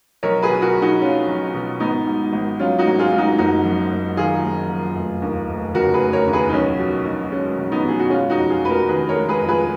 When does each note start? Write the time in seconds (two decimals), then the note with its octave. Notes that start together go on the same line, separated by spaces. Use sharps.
0.23 B1 A#4 C#5
0.42 G#4 B4
0.50 B2
0.62 F#4 A#4
0.75 B1
0.82 D#4 F#4
1.02 F#3 C#4 F4
1.28 B1
1.54 B2
1.80 G#1 B3 D#4
2.07 G#2
2.33 G#1
2.59 F#3 C#4 F4
2.79 D#4 F#4
2.86 G#1
2.99 F4 G#4
3.12 G#2 F4
3.18 D#4 F#4
3.38 F#1 D#4 F#4
3.64 F#2
3.91 F#1
4.17 D#3 F4 G#4
4.44 F#1
4.69 F#2
4.95 F1
5.22 D#2
5.48 F1
5.74 C#3 F#4 A#4
5.94 G#4 B4
6.01 F1
6.13 A#4 C#5
6.27 D#2
6.33 G#4 B4
6.49 D#4
6.53 B1 C#4
6.79 B2
7.05 B1
7.32 G#3 C#4
7.58 B1
7.72 B3 D#4
7.84 B2 G#4
7.99 F#4
8.10 G#3 C#4 F4
8.30 D#4 F#4
8.36 F2
8.50 F4 G#4
8.62 F1 B4
8.69 F#4 A#4
8.89 D#3 G#4 B4
9.09 A#4 C#5
9.15 G#3
9.29 G#4 B4
9.41 F2
9.48 G#4 B4